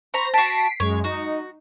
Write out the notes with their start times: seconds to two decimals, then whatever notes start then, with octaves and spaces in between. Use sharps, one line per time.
0.14 C5 A#5 B5 C#6 A#6
0.34 F#4 A5 B6 C7 D7
0.80 F#2 G#3 C#5
1.04 D#4 F#4